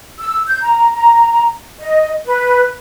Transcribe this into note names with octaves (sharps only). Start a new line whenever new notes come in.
E6
G6
A#5
A#5
D#5
B4